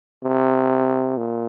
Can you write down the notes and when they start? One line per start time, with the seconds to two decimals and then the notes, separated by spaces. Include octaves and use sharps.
0.23 C3
1.17 A#2